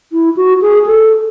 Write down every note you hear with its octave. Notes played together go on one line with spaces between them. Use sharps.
E4
F#4
G#4
A4